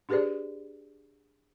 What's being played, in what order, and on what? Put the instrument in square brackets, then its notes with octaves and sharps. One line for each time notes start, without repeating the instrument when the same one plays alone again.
[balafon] D4 G4 G#4 B4 C5 D5